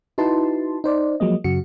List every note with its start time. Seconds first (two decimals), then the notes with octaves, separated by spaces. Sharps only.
0.18 D#4 E4 F#4 B4 A5 C6
0.84 D#4 C5 D5
1.20 F3 F#3 G#3 A#3 D#5
1.44 F#2 C#3 F#4 C#7